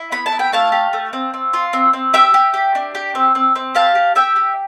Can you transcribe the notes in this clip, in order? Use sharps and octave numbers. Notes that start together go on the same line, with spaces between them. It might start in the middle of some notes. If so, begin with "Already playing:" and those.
Already playing: E4
B3 B5
A5
E4
G5
A3 F5 A5
G4
A3
C4
C4
F4
C4
C4
G4 E5 G5
G4
G4
D4
G4
C4
C4
C4
G4 F5 A5
G4
G4 E5 G5
G4